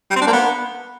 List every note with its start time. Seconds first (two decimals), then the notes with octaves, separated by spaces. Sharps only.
0.10 G3
0.16 C4
0.21 D4
0.27 A#3
0.33 B3